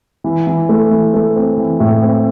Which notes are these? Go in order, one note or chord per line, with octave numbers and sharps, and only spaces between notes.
E3
E3
A3
E3
A3
C4
E3
A2
C4